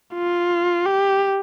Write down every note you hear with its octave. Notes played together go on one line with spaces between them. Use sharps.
F4
G4